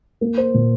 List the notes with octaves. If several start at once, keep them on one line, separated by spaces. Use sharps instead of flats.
A#3
C5
A#2